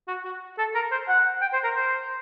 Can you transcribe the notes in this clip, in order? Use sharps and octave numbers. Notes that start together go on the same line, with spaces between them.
F#4
F#4
A4
A#4
C5
F#5
G5
C5
A#4
C5